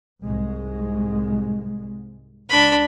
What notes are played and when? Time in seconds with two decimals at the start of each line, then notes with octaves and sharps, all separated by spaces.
0.23 C2 G#2 G#3
2.49 C#2 D4 B5